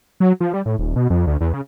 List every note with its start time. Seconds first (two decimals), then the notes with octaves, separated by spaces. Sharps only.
0.20 F#3
0.40 F3
0.53 G3
0.66 A2
0.79 D#1
0.96 B2
1.10 F2
1.27 D2
1.41 E2
1.53 C#3